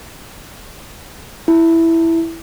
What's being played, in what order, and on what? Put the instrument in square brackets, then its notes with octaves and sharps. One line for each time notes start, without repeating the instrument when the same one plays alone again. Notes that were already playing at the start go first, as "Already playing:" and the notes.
[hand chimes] E4